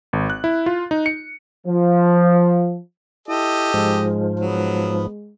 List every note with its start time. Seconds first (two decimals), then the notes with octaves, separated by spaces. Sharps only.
0.13 G#1
0.30 F#6
0.44 E4
0.66 F4
0.91 D#4
1.06 C#7
1.67 F3
3.28 E4 G4 A4 D#5
3.74 G#2 F3 G#3
4.40 F#3 G#3 B3